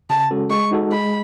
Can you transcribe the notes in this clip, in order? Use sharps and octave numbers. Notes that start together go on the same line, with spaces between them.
C#3 A5
G#3 C#4 F#4 A4
G#3 C#6
D#4 F#4 A4
G#3 B5